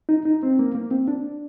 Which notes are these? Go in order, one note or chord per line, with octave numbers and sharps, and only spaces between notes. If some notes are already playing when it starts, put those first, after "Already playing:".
D#4
D#4
C4
A#3
A#3
C4
D4